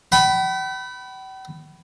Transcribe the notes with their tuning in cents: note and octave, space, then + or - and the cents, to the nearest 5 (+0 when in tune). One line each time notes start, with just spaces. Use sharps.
G5 -45 B5 +0